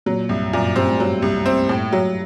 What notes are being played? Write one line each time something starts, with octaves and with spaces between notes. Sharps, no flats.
A#2 F#3
C2 G2
F#2 A#2
G2 C4
A2
G2 F#3
C2
C4
A2
F#3